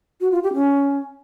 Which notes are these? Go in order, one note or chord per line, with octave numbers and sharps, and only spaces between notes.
F#4
F4
G4
C#4